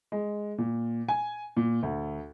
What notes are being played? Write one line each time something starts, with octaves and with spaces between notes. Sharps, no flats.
G#3
A#2
G#5
A#2
D2